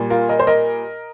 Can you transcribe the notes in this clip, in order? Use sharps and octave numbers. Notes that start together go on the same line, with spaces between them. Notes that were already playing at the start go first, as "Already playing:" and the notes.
Already playing: A#2 G3
F4 A#4
A#4 D#5
C5
A#4 D#5